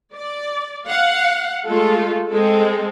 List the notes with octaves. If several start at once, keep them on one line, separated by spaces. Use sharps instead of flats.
D5
F5 F#5
G#3 A3 F4 A4
G#3 C4 A4